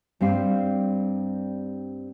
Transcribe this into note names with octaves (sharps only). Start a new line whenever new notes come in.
G2 G3 C4 F5